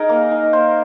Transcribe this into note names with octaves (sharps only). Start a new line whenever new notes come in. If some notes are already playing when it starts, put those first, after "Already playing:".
Already playing: D#4 G#4 A#4
A#3
D#4
A#3 C5